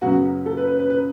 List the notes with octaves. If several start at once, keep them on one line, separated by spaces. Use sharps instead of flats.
F#2 C#3 F#3 B3 F#4
A4
B4
B4
B4
B4